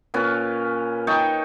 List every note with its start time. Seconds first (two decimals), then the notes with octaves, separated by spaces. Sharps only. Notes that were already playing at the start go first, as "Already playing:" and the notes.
0.14 A#2 C#4 B4
1.07 D#4 G5 A5 C#6